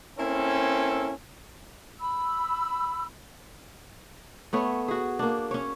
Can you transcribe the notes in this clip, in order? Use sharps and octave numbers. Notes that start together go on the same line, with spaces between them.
A#3 C4 C#4 E4 A4 A#4
B5 E6
A3 B3 C#5
F#4 G#4
A#3 D4
C#4 C#5